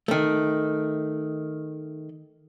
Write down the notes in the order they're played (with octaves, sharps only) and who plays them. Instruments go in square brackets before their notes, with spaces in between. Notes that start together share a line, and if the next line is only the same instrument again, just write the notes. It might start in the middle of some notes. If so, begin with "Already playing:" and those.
[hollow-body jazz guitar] D#3 A3